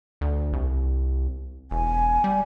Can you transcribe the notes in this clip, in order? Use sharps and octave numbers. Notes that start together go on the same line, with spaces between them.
D2
C2
E1 G#5
G3